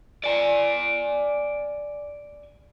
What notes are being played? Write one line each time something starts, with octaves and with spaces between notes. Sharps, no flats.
D5 G#5